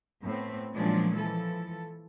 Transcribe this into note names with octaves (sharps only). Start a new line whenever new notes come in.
A2 B3 C4
A#2 F3 F#3 G#3 C#4 D4
E3 F3 A4